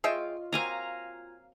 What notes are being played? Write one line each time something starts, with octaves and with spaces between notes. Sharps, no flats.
F4 G#4 C#5 D#5 E5 G5
F#3 A#3 C4 F5 G#5 A#5